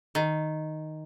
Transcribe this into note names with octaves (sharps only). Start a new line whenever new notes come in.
D#3